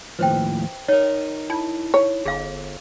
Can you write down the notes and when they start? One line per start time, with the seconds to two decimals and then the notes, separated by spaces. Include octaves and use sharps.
0.19 D#2 A2 F3 B4 C5 G5
0.88 D#4 A#4 C#5
1.50 E4 A5
1.94 C#5
2.25 G1 G#4 F5